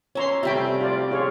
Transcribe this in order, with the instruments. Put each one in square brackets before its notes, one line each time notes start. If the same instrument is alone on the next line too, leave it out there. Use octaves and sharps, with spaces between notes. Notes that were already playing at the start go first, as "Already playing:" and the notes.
[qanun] C#4 E5 [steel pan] C#5 A#5 C6
[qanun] C3 G3 A3 [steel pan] E5 G5
[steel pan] F4 D5
F4 G#4 C#5